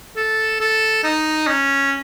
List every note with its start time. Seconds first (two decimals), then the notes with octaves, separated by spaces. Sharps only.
0.16 A4
0.60 A4
1.03 D#4
1.47 C#4